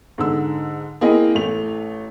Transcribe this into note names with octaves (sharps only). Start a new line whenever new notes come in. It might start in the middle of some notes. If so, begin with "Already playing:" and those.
G#2 D3 E6
A#3 C4 E4 G#4 D#5 G#5
A1 A3 F7